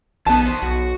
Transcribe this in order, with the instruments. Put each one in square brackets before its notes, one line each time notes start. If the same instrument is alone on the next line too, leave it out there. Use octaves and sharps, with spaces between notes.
[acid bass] A#1 [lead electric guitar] D#3 [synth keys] B3 D#7 [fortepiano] A5
[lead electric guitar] C2 C5
[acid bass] B1 [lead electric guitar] F#4